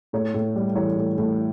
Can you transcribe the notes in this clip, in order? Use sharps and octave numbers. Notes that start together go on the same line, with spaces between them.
A2 C#5
A2
G3
E3 C#5
A2
A2